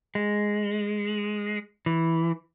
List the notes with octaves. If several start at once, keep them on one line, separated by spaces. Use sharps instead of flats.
G#3
E3